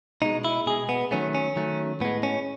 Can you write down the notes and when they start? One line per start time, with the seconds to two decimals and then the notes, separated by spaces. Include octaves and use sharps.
0.22 B2 G#3 D#4
0.45 E4
0.66 B2 G#3 G#4
0.89 B3
1.11 D#3 F#3 A3 C#4
1.35 C#4
1.56 D#3 F#3 A3
2.00 A2 G#3 B3
2.23 C#4